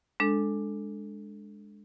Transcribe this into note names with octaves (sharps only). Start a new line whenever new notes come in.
G#3 D4 A4